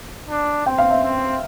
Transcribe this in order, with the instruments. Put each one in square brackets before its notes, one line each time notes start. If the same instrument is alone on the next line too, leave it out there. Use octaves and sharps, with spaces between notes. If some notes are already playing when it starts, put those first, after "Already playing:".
[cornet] D4
[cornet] C4 [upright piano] G5
[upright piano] F5
E5
[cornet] C4